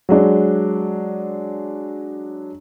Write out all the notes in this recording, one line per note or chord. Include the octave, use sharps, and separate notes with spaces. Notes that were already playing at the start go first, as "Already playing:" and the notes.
F#3 G#3 D4